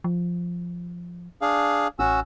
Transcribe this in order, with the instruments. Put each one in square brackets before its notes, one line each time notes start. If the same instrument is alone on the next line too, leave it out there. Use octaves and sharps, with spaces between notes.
[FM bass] F3
[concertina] D4 G#4 F5
[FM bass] A1 [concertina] C#4 F#4 E6